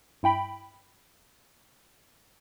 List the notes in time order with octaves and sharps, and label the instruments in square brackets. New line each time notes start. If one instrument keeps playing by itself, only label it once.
[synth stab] G2 E4 G5 B5